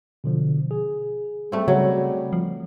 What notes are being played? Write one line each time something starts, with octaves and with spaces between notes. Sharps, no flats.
B2 D3 F3
G#4
G3 A3 C4
C#3 F#3 G3
F3